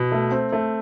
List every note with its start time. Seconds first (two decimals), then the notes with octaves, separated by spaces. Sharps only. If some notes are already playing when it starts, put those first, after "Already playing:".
Already playing: B2
0.12 A3
0.31 C4
0.52 A3